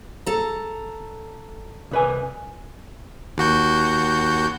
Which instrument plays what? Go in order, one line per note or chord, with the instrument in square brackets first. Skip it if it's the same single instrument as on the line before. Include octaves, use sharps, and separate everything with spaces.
[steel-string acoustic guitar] A4 A#5
[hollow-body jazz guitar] C2 B4 G#5
[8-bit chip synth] D#2 F#4 G6